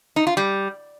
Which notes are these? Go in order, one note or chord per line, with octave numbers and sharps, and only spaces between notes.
D#4
F4
G3